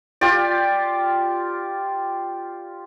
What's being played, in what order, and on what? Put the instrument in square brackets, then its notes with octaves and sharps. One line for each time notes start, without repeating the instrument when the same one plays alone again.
[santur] F4 G4 D5